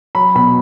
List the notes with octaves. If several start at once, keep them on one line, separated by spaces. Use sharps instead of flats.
F#3 B5
B2 B5